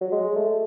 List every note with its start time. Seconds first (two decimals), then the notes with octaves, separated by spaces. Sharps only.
0.01 F#3
0.12 G#3
0.36 A3